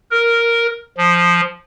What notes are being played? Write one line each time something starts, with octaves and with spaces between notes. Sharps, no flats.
A#4
F3